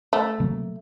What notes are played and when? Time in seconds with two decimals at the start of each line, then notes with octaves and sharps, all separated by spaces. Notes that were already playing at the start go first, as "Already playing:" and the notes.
0.13 A3
0.40 C3 F#3 A#3